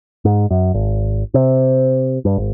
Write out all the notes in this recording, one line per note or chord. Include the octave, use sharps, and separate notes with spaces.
G#2
F#2
G#1
C3
G2
G#1